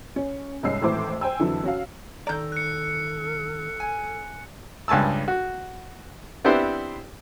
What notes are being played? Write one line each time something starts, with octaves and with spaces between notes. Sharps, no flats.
C#4
C2 G#2 C#4 D#5 E6 C7
G#1 A2 E3 C5 D6
C5 G5 G#5 E6
F2 D3 E3 F#3
C#4 F#4 F5
D#3 A4 D5 A#5 G6
F#6 C#7
G#5
C#2 G2 G#5 A5 E6
F#4
B3 C4 D4 E4 G4 C5